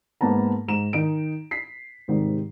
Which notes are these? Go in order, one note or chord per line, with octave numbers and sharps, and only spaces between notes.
G#2 A#3 B3 A5 A#5
G#2 A#5 E7
D#3 D#4 D7
B6 C7
G#2 C3 D#3 G3